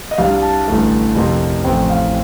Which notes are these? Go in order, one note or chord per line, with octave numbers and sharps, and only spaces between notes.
D#5
C2 C3 G3 D4 F5
A5
A1 G2 D3 A3
F2 C3 F3 A#3
A1 A2 F3 C4 G5
F5